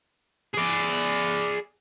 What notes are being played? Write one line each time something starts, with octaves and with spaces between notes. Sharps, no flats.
G#4 D5